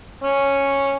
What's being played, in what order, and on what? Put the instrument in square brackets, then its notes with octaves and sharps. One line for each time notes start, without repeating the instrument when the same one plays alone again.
[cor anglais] C#4